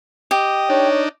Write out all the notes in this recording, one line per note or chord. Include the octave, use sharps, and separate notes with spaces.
G4 D#5
D4 D#4 C#5